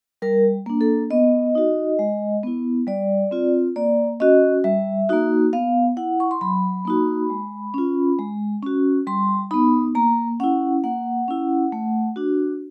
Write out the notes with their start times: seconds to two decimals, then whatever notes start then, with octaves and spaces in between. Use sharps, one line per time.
0.22 G3 A#4
0.66 A#3 D4
0.81 A4
1.11 B3 D#5
1.55 D#4 F#4
1.99 G#3
2.43 B3 E4
2.87 G3 D5
3.31 C4 F4
3.76 A#3 D5
4.20 C#4 F#4 D#5
4.64 G3 E5
5.09 A#3 D#4 F#4
5.53 B3 F5
5.97 E4 F#5
6.20 C#6
6.31 C6
6.41 F#3 B5
6.85 A#3 D#4 F#4
7.30 G#3
7.74 C#4 F4
8.19 G#3
8.63 C#4 F#4
9.07 G3 C6
9.51 B3 D#4 B5
9.95 A#3 A#5
10.40 C#4 E4 F#5
10.84 A#3 F#5
11.28 C#4 E4
11.72 A3
12.16 D4 F#4